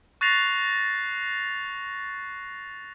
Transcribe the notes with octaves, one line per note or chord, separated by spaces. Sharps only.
C#6 F#6 A6 A#6 C7 F7